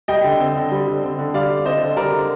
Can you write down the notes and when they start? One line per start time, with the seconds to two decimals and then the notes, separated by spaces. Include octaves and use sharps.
0.08 G3 D#5 G5
0.24 D3
0.40 C4
0.56 D3
0.72 G3
0.88 D3
1.03 C4
1.19 D3
1.34 G3 D5 F5
1.51 D3
1.66 C4 C5 D#5
1.81 D3
1.97 G3 A#4 D5
2.12 D3